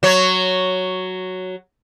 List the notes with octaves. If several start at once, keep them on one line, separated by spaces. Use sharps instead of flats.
F#3 C#5